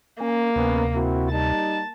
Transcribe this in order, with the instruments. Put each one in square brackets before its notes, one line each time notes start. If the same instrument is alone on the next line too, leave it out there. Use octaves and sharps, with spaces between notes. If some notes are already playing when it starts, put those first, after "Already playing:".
[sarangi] A#3 [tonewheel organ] C#4
[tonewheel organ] D2 C3 [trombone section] B3 C#4
[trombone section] C4 E4 F#4
[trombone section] G3 D#4 [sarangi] A5